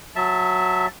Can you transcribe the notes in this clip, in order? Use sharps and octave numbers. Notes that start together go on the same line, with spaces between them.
F#3 E5 A5